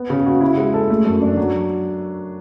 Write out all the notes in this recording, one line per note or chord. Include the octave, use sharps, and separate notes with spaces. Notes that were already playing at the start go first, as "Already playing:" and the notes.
Already playing: B3
C#3
F#4
E4
G#3
A4
A3
F#2
D4
F#3